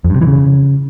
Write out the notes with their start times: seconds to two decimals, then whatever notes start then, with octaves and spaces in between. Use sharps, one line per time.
0.04 F2
0.10 G2
0.16 C3
0.21 E3
0.27 C#3